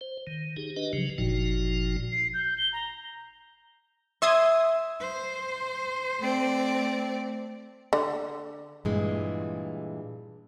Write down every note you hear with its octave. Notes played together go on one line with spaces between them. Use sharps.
C5
D#3
D#4 G4 G#4
D4 G4 B4 D#5
C#3 F3 F#3
G1 A#2 F3 D#4 F#4
C7
G6
G7
A#5
E5 C6 D#6 G#6
C5
A3 C4 D5
D3
G2 A#2 E3 G#3